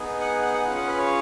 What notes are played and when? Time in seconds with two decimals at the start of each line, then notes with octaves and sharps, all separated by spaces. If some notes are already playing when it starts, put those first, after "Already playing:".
Already playing: B3 D#4 G#4
0.21 F#5
0.42 F#5
0.54 F#5
0.65 C#4 F4 G#4 F#5
0.76 F#5
0.87 B4
0.98 C#5